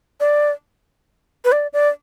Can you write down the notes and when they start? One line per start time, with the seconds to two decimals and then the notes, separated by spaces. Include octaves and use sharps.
0.20 D5
1.45 B4
1.52 D5
1.73 D5